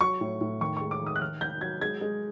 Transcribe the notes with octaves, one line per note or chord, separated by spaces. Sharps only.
F#3 C#6
A2
A2
D#3 C#6
G#3 C#6
D6
D#3
D#6
F#6
D#3 F6
D#3 G6
F#3 G#6
G#3 G#6
G#3